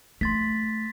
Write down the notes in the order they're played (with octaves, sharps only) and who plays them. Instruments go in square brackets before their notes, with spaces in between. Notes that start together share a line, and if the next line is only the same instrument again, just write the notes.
[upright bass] A3 [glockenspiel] C6 A6 B6